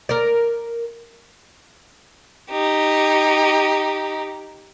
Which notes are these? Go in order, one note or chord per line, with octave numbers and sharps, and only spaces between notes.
A#4 D5
D#4 G4